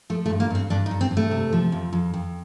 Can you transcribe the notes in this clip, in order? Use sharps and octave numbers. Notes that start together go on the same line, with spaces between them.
F3 A3
A3
G2
A#3
G2 C4
G2 D4
D#4
G2
C4
G2
A3
C3
F3
F2
F2
F2